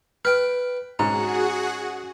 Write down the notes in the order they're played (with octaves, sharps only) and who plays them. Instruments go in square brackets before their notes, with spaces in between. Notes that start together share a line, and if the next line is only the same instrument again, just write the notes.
[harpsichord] B4 G5 [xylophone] F6
[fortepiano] G#2 [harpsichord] C#4 [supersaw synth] F#4 G#4 F#5 [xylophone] A#5